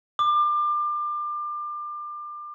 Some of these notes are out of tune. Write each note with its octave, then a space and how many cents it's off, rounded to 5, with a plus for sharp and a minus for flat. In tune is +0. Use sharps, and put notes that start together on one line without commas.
D6 +30